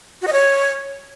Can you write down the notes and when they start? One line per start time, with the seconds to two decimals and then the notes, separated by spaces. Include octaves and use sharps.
0.22 F#4
0.27 D#5
0.33 C#5